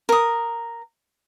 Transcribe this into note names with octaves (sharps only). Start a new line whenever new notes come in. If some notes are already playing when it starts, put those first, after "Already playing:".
A#4 D#6